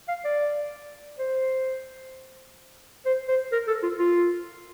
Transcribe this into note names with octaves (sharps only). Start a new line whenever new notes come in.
F5
D5
C5
C5
C5
A#4
A4
F4
F4